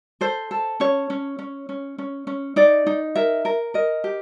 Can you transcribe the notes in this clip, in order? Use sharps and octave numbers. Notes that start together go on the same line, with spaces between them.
A4 C5
A4
C#4 C#5
C#4
C#4
C#4
C#4
C#4
D#4 D5
D#4
A#4 E5
A#4
A#4 D#5
G4